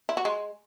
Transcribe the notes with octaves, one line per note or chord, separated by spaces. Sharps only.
E4
F#4
G#3